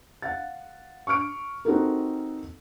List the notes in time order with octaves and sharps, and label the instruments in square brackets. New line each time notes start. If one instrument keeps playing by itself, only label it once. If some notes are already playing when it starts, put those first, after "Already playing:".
[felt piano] F5 F#5 A6
C#6 D6 F6 D7
C4 D#4 F#4 G4 A4 A#4